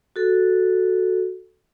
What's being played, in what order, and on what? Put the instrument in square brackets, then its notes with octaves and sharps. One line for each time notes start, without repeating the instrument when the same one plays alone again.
[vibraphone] F#4 A4